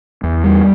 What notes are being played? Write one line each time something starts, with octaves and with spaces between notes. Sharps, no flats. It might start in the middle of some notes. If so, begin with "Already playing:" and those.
E2
G3